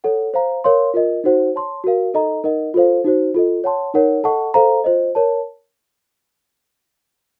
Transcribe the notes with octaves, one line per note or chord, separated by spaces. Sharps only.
A4 C#5 F#5
C5 F5 A#5
A#4 C#5 F5 C6
F4 A#4 D#5
D#4 F#4 C5 F#5
C#5 A5 C6
F#4 A#4 F5
D#4 A4 D#5 A#5
D#4 A#4 D#5 F#5
F4 A4 C5 F5
D#4 F#4 C5
F4 A4 D#5
C#5 F#5 A5 C6
D#4 A#4 C#5 F#5
A4 D#5 F#5 A5 C#6
A4 C5 F5 A#5
F4 C5 D#5
A#4 C#5 A5